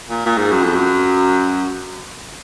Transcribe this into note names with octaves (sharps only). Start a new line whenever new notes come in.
A#2
A#2
G#2
F#2
F2
F#2